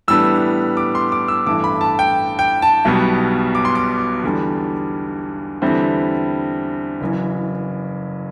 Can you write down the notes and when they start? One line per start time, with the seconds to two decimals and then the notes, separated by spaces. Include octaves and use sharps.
0.08 A2 E3 G3 B3 D4 E6
0.77 D6
0.95 C6
1.12 D6
1.28 E6
1.46 A1 G2 E3 A3 D6
1.64 B5
1.81 A5
1.99 G5
2.39 G5
2.62 A5
2.85 B1 B2 G3 B3
3.55 D6
3.65 C6
3.75 D6
4.24 E2 D3 G3
5.62 E2 D3 G3 C4 E4
7.01 F#1 F#2 E3